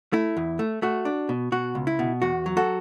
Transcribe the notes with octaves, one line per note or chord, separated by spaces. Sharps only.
A3 E4
E2
A3
A3 F#4
D4
B2
B2 F#4
C#2
E4
B2
E2 F#4
F#3
F#4 A4